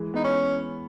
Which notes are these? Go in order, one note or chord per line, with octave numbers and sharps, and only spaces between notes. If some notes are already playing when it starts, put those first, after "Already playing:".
Already playing: E3 G#3
G#3 B3 D#4
C#4